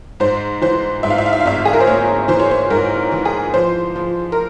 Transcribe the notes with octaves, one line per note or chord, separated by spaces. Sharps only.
G#2 C5
E3 C5
G#2 E5
F5
E5
F5
E5
F5
G#1 E5
G#4
A#4
C5
A#3 C#5
E3 C5
C#5
C5
G#2 A#4
E3
G#4
F3 C5
F3
A#4